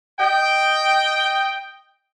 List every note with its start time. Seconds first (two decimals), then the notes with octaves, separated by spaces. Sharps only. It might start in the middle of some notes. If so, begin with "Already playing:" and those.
0.19 D#5 G5